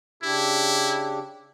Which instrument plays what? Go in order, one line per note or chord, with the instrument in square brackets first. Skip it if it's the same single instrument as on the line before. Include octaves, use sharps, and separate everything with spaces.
[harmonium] C#3 D4 G4 [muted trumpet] E4